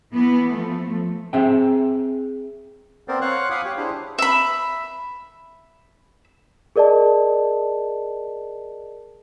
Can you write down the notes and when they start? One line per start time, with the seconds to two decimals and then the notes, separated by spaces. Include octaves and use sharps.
0.13 E3 B3
0.51 F3 A3
1.33 C4 G#4 E5 G5
3.08 B3 C4 A#4 C5 D5
3.21 C5 C#5 F5 F#5 C#6 F#6
3.50 F5 F#5 G#5 B5 D6 D#6
3.64 G4 C#5
3.77 D4 E4 G4 G#4 C5
4.19 E5 B5
6.76 G#4 A#4 D5 D#5 A5